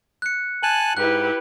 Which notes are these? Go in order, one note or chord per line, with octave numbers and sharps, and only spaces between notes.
F#6 C#7
G#5 A5 F#6 F#7
G#2 E4 G4 B4 F#6